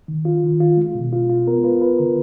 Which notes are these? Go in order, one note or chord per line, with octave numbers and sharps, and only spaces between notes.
D#3
F4
D#3
F4
G#3
B2
F4
F4
B3 A#4
F4 B4
F4 B4
D3 A#4